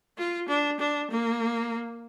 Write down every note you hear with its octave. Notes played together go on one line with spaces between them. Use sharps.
F4
D4
D4
A#3